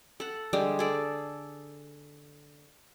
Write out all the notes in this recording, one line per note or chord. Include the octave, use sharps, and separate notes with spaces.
A4 F#5
D3 G3 G#3 G4
G#4 A4 D5